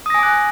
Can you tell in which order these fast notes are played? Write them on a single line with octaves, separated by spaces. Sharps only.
D#6 A#6 G#5 D6 F#6